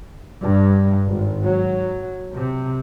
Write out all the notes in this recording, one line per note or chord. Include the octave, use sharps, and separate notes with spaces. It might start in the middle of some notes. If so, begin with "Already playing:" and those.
G2
G#1
F#3
C3